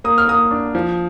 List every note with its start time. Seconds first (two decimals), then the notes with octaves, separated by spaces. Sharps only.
0.04 A#3 D#6
0.18 F6
0.28 A#3 D#6
0.51 D4
0.75 F3